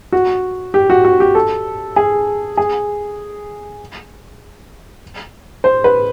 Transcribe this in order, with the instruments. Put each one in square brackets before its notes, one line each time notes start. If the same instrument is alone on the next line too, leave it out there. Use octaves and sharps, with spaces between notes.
[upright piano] F#4
G4
F#4
F#4
G4
A4
G#4
G#4
C5
B4